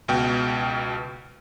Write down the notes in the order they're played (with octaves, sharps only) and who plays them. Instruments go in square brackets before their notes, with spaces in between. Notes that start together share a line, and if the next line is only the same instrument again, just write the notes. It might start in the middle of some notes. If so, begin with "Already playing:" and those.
[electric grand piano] C#2 B2 G5